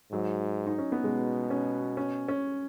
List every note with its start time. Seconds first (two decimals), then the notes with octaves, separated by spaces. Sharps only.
0.12 G#2 F#3
0.67 D#4
0.78 C#4
0.92 B3
1.04 B2 G#3
1.50 C#4
1.97 C#4
2.28 C#4